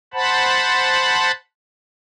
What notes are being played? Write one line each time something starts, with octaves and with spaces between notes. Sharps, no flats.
C5 F#5 A5 B5